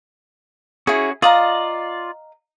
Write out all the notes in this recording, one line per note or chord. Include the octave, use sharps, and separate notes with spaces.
C#4 E4 F#4 G#4
F4 D5 D#5 F5 A#5